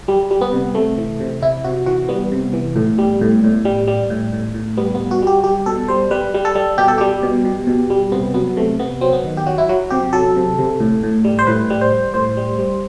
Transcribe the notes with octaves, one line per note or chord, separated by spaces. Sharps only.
G3
G3
B3
C3
C3 A3
E3
C3
C3 E4
C3 F#4
E3 F#4
G3 B3
C3
E3
A2
G3
A2
A2
G3
G3
A2
A2
A2
G3 B3
B3
G3
F#4
G3 G4
G3 G4
B2 A4
G3 C5
G3 B4
G3
A4
G3
B2 G4
A4
G3 G4
B2
B2
B2
G3
C3 B3
F#3 B3
C3 A3
C3 B3
F#3 C4
B3
D#3
G4
F#3 F#4
E4
F#3 F#4
C3 G4
F#3 A4
C3
C3
A2
A2
G3
C5
A2 B4
G3
C5
G3
A2 C5
G3
G3